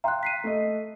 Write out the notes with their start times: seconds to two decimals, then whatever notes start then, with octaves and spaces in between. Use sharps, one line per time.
0.04 F5 G5 A#5 C6 F#6
0.23 B6 C7 D#7
0.44 A3 D#5